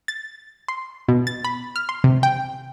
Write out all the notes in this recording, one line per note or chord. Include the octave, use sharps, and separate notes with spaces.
A6
C6
B2
A6
B5
F6
C6
C3
G5